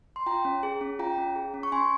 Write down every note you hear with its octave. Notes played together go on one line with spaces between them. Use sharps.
C6
F4 G5 A#5
C#4
G#4
C#4
F4 G5 A#5
C#4
G#4
C#4
C#6
C#4 G#5 C6